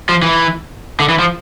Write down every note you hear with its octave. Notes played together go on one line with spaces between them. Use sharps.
F3
E3
D3
E3
F3